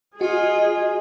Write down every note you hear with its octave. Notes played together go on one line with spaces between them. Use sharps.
F4 F#4 G#4 D#5